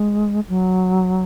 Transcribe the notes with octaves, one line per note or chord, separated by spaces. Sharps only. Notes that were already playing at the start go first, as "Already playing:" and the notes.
Already playing: G#3
F#3